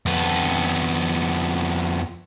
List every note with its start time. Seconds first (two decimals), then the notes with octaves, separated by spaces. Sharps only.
0.06 F2 B3